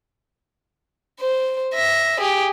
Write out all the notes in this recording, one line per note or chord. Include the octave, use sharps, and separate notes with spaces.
C5
E5 A#6
G4 G#4